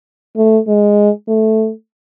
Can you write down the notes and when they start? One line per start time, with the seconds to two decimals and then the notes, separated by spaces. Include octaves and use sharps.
0.37 A3
0.67 G#3
1.28 A3